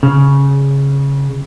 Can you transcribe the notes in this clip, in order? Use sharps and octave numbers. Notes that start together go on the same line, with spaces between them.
C#3